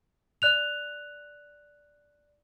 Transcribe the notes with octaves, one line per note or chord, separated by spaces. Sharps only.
D5 F#6 F7